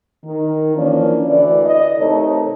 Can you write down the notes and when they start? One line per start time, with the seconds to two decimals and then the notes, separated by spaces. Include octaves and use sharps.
0.25 D#3
0.75 E3 F3 A#3 C#4 D4
1.29 D2 E3 D5
1.66 D#5
1.98 C3 D#3 A3 D#4 A4 C#5